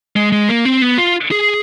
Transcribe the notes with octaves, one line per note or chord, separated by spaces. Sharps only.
G#3
G#3
A#3
C4
B3
F4
G#4